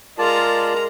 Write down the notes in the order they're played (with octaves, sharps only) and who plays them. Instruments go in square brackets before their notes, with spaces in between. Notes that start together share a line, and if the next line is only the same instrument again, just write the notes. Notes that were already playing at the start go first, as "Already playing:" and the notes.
[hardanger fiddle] G#3 A#5 [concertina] F4 D5 A5 [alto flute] A#4